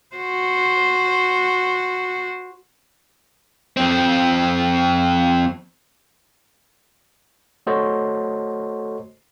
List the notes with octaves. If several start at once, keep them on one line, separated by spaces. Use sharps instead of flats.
F#4 C5
F2 C4
A3 F#4 A4 C5 C#5 D#5